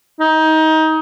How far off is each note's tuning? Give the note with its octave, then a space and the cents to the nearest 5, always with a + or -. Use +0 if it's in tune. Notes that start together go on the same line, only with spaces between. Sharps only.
D#4 +25